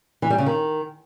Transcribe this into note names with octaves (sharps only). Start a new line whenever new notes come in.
E3
G3
C#3
D#3